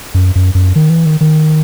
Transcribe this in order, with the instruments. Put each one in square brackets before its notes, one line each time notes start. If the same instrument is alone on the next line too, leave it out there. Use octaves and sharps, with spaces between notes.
[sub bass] F#2
F#2
F#2
D#3
E3
D#3
D#3